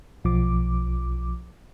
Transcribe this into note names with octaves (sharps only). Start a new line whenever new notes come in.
B1 F3 D6